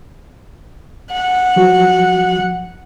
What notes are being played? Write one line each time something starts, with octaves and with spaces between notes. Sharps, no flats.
F#5
F3 F#3 F#4